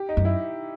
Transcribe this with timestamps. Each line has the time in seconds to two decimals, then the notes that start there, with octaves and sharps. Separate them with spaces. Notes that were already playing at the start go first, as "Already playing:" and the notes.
Already playing: G4
0.09 D#4
0.17 F#2
0.25 E4